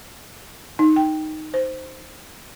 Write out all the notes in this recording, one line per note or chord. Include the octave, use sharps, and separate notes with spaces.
D#4
G5
C5